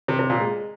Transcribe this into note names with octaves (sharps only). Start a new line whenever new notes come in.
C3
C3
A#2
G#3